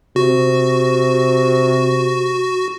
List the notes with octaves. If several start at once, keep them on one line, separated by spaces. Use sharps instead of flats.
C3 F#4